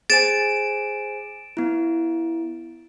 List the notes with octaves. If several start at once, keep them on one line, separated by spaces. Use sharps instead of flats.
G#4 C5 G#5 A6 D7 E7
B3 E4